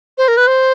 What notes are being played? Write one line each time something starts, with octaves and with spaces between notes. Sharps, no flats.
C5
A#4
B4
C5